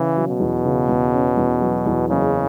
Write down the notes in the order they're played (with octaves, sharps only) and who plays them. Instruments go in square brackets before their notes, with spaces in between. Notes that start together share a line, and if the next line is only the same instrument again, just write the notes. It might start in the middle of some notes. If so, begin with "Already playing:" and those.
Already playing: [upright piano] C#3 C#4 [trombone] E3
[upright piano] F#3
[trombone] B2
[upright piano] E2
C#3
E2
C#4
E2
F#3
E2
[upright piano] F#1 [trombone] C#3